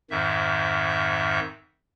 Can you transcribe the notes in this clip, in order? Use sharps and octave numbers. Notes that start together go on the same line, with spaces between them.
F2 G#2 D#3 E5